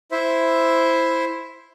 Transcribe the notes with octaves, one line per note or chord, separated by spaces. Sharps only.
E4 C5 E5